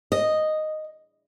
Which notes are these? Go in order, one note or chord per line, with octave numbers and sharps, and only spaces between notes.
D#5